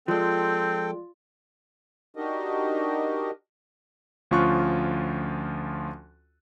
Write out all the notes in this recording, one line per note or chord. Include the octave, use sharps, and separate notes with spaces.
F3 G#3 C4 F4 A4 D5 G5
D4 D#4 F#4 G4 A#4 D#5
D2 F3 C#4 F4 C#6 F#6